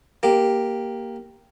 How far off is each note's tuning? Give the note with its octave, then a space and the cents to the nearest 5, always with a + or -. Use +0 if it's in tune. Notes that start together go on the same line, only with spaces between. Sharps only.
A#3 +0 G4 +0